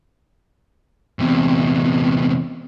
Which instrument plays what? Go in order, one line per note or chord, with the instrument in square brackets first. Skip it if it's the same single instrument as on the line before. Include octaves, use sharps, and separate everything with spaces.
[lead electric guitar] E2 C3